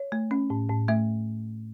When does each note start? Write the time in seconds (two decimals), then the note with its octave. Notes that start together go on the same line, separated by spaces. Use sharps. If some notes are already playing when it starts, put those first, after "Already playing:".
Already playing: C#5
0.12 A3
0.31 C#4
0.50 A2
0.69 A2
0.88 A3 E5